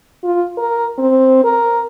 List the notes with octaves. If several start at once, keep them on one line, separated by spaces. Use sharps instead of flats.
F4
A#4
C4
A#4